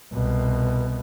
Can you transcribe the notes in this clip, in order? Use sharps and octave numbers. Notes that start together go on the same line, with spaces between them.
C2 B2